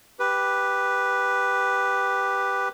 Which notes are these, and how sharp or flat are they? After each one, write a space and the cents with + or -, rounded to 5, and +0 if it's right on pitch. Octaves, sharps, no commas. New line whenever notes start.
G4 +0 B4 +0